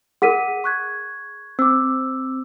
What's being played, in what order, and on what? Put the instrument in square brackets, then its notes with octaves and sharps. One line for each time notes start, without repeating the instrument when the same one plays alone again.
[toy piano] G#4 A#4 [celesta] F#5 B6 D#7
[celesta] C#6 F#6 G#6
[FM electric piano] C4 [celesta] D6 E6